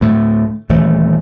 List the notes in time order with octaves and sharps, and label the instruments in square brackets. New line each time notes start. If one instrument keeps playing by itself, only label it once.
[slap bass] D2 A2 A3
D#1 D2 E3 A3